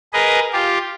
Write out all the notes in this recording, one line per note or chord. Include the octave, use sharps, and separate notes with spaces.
G#4 A#4 B4 D#5
F4 G4